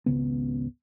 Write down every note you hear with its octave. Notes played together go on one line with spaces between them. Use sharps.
G#1 C#2 C#3 B3